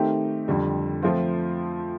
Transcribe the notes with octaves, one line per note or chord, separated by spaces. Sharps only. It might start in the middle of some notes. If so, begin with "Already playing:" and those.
Already playing: D#3 A3 C4 D#4 G4
F2 D3 G3
F3 A3 C4 F4 C5